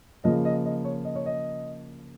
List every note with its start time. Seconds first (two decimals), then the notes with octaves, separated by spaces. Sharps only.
0.24 C#3 F3 A#3 D#5
0.45 D#5
0.65 D#5
0.84 C#5
1.05 D#5
1.15 C#5
1.26 D#5